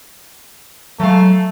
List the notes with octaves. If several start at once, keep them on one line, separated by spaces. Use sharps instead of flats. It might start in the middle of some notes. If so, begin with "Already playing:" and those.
F#3 G#3 A3 F5